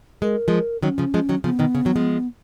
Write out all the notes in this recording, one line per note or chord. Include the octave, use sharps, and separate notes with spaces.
G#3 A#4
F3 G#3
D#3 F#3 C#4
C#3 F3
F3 G#3
D#3 F#3
C#3 F3 B3
B2 D#3
C#3
D#3 F#3
F3 G#3